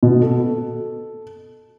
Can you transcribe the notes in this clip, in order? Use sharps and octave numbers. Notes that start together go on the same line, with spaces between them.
B2
A4